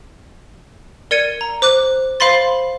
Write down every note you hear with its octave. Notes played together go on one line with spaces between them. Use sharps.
A#4 D5 G#6 C#7 D#7
A#5
C5 D6 F#6
C5 F5 B5 C6 A6